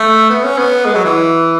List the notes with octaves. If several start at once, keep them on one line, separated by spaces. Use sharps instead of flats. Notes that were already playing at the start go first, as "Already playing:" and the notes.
Already playing: A3
B3
C#4
B3
G#3
F#3
E3